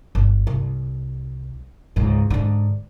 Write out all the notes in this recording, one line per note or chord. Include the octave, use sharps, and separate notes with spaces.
G1
C2
C#2 G#2
G#2 D3